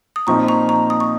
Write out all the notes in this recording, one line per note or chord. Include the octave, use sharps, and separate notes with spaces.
D#6
A#2 F3 C4 D#4 A#5 C#6
A#5 C#6
A#5 C#6
D#6
C#6